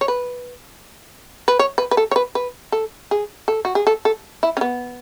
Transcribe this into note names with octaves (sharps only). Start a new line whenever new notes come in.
C#5
B4
B4
C#5
B4
B4
A4
C#5
B4
B4
A4
G#4
A4
F#4
G#4
A4
A4
E4
C#4
B3